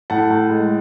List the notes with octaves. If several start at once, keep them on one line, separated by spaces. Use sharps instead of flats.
A2 F#5 A5
A2
G#3